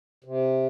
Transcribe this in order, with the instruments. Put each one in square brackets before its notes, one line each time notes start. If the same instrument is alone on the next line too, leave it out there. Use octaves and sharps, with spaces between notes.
[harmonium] C3